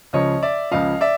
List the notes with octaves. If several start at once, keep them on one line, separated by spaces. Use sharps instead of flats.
C#2 C#3 F3 C#5 D#5
D5 E5
C#2 C#3 F3 D#5 F5
D5 E5